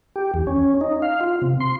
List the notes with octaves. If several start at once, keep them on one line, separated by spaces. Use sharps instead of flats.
G4
E2
C#4
D#4
F5
F4
C3
C6